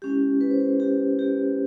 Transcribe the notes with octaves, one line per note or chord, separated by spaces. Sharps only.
G#3 C#4 E4 G4
B4
C5
B4
G4
G4